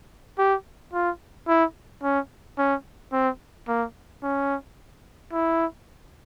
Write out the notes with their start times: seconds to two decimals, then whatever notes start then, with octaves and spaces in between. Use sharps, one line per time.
0.38 G4
0.93 F4
1.48 E4
2.03 C#4
2.58 C#4
3.13 C4
3.68 A#3
4.23 C#4
5.33 E4